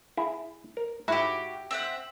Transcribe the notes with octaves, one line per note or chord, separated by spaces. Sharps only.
E4 G#4
A#4
G#2 E4 F#4 G4
C4 E5 F#5